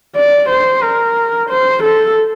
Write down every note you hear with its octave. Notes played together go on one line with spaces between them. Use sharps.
D5
C5
A#4
C5
A4